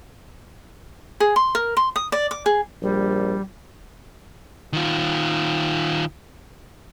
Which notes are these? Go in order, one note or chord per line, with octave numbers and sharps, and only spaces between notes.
G#4
C6
A#4
C6
D#6
D5
D6
G#4
A#1 G3
D#3 F4